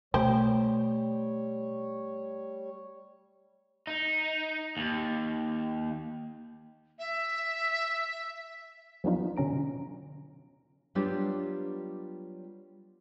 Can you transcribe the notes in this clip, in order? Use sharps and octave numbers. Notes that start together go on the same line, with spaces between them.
B2 G3 A3 G4 C5 C#5
D#4
D#2
E5
F3 F#3 B3 D4 D#4 F4
B2 D3 C#4 A#5 D7
F#3 G3 B3 D4 F4 G4